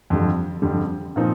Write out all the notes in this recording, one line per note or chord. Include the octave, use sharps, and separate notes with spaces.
F2 D3 G3
F2 D3 G3
A#2 F3 C4 D#4